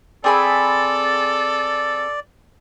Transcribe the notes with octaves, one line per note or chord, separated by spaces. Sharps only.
C4 G#4 A4 D5 B5